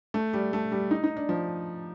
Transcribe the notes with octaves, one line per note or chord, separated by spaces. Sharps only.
A3
G3
A3
G3
D#4
D#4
D4
F3